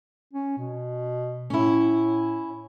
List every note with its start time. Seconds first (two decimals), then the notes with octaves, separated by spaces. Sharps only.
0.33 C#4
0.58 B2
1.50 A2 C#4 E4